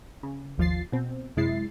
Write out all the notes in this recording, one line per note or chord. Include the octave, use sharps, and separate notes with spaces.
C#3
G#1 D#2 F3 F4 A6 C7
B2 C4
F#2 C3 G#3 E4 A6 C7